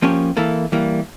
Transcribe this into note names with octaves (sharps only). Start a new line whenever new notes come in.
F3 A#3 C#4 G4 C#5
E3 A#3 E4 A4
E3 G3 A#3